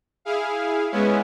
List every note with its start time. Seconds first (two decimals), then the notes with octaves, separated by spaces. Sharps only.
0.25 E4 G#4 F5
0.92 G#3 B3 C#4 E4